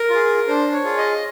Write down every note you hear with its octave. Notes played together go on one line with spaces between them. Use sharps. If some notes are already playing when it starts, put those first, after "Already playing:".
Already playing: A#4
F4 G#4
D4 C5
C#5
F4 G#4
D#5